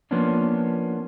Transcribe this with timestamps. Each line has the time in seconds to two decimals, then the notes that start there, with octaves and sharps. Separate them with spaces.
0.11 F3 A#3 B3 C#4 D4